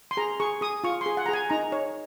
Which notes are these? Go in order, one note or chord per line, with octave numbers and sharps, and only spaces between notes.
C6
G#4 A#5
G#4 C#6
G#4 D#6
F4 C#6
C6
G#4
F#5
A#5
G#4 G#5
D#4 A#5
C#5